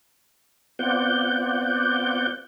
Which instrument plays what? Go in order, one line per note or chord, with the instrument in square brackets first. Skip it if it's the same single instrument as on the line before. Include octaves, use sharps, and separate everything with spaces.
[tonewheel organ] B3 C4 F4 D5 F#5 G6